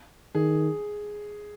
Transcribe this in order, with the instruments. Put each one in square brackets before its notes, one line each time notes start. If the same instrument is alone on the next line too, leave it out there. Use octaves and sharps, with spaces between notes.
[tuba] D#3 [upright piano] G#4